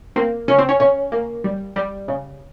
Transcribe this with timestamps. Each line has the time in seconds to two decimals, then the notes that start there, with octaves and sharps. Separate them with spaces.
0.16 A#3 C4
0.48 C#3 C#4
0.59 C4
0.69 C#4
0.80 C#3 C#4
1.12 A#3
1.44 G3
1.76 G3
2.08 C#3